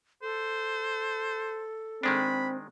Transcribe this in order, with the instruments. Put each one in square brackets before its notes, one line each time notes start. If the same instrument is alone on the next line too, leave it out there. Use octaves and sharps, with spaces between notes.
[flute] A4 [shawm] C5
[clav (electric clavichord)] D#3 G#3 D4 [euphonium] C4 [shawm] B5